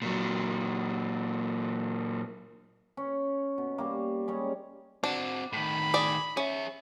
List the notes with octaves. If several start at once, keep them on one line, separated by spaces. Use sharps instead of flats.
A#2 F#3
C#4
B2
G3 A#3
G3 G#3 C#4
C4 D4 F#4
A2 D#3 B5
G#4 D5
C#4 G#4 E5